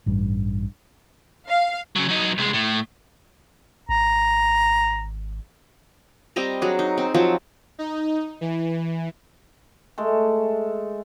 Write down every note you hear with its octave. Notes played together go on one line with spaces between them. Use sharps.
A1 G2
F5
C#3 F#3
F#3 D#4
C2 G#3
A2
G#1 A#5
G3 C4 D#5 A#5
F#3 D4 G#4
D#4
C4
F3 F#3 C4
D#4
E3
G#3 A3 A4